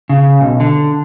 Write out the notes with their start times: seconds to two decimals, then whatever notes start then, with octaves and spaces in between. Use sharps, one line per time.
0.10 C#3
0.41 B1
0.60 D3